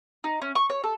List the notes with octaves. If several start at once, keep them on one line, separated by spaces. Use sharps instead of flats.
D#4
C#4
C#6
C#5
A4